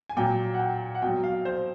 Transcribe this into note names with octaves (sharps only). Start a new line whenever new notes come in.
G#5
A#2 F#3 G5
F#5
G5
F#5
B2 F#3 G5
F5
C5